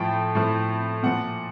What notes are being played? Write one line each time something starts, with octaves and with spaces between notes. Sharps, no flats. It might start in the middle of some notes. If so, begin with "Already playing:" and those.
Already playing: A2 F3 G5
A2 F3
A#2 F3 F#5